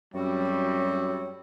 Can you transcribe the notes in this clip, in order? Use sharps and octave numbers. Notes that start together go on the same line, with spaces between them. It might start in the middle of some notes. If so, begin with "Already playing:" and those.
F#2 A2 G3 C4 F#4 C#5